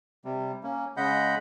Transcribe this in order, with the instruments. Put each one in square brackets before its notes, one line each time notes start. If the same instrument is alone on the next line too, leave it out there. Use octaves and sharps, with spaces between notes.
[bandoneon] C3 G3
A#3 C#4
C#3 G#3 D#5 F#5 B5 G6